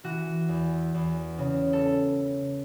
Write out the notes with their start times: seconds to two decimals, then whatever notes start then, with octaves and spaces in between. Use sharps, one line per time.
0.04 E3 F#4
0.49 E2
0.94 E2
1.38 C#3
1.73 A4